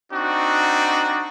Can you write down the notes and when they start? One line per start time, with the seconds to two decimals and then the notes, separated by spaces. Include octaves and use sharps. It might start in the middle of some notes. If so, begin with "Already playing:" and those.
0.11 C4 D4 D#4 F#4